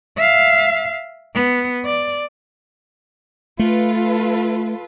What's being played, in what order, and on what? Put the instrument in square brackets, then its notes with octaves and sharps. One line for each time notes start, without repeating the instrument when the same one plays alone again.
[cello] E5 F5
B3
D5
[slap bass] A3 [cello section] F4 A4 B4